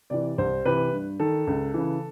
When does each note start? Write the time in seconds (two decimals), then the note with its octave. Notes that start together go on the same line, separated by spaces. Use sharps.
0.10 C3 E3 D5
0.38 C2 C5
0.65 C3 E3 B4
0.93 G2
1.20 D#3 A4
1.47 C#2
1.74 C#3 E3